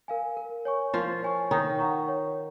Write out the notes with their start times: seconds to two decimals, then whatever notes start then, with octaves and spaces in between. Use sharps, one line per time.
0.08 A#4 F5 G#5
0.37 A#4
0.65 C#5 G#5 C#6
0.94 F3 F4 A#4
1.23 C#5 G#5 C#6
1.51 D#3 D#4 C#5
1.79 F#5 A#5 C#6
2.08 C#5